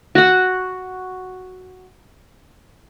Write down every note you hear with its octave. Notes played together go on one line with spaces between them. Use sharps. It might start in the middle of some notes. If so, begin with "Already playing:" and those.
F#4 F#5